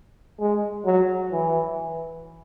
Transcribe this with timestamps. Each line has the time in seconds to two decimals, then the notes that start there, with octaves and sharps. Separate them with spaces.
0.40 G#3
0.86 F#3
1.32 E3